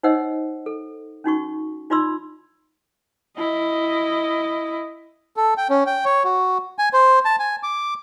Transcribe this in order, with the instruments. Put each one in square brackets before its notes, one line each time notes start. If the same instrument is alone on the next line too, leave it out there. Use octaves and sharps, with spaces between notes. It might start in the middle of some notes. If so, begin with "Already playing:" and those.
[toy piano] D#4 C5 C#5 D#5 F#5 E6
A4
C#4 D#4 F#4 C#6
D#4 F4 D5 B5 C6 E6
[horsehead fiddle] E4 D#5
[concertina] A4
G5
C#4
G5
C#5
F#4
G#5
C5
A5
G#5
D6